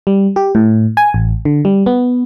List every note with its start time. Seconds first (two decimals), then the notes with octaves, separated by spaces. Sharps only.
0.07 G3
0.36 G4
0.55 A2
0.97 G#5
1.14 A1
1.45 D3
1.65 G3
1.86 B3